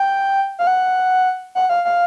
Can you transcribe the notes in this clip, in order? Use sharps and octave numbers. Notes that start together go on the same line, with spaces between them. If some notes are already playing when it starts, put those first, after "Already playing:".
Already playing: G5
F5
F#5
F#5
F5
F5